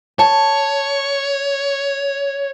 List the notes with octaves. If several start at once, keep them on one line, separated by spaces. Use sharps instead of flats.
C#5 A5